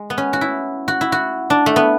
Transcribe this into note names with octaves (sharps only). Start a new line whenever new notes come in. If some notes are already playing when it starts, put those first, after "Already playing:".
Already playing: G#3
B3
C#4
F#4
E4
F#4
E4
F#4
D4
A3
B3